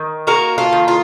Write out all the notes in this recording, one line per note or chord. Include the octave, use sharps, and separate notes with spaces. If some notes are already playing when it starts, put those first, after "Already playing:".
Already playing: D#3
A#3 F#4 A#4
F4 A4
D#3
F4